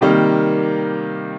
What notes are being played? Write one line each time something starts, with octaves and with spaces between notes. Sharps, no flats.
C3 D#3 G3 A#3 D#4